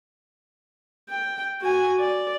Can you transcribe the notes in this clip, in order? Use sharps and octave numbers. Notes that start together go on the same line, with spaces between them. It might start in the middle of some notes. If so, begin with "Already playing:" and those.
G5
F#4 G#5
D5